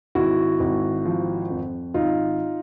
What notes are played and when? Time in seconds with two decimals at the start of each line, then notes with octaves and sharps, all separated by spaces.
0.15 G#1 E4 F#4
0.60 G#1
1.05 F3
1.50 F2
1.94 G#1 D#4 F4